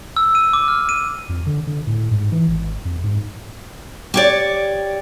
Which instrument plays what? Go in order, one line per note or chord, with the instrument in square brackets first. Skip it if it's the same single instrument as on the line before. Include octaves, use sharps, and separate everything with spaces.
[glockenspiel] E6
D#7
D6
F6
D#7
[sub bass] F2
D3
D3
A2
G#2
E3
G#1
F2
G#2
[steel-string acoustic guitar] G4 C#5 D5